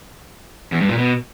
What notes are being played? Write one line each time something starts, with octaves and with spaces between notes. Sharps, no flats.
E2
G2
A#2
B2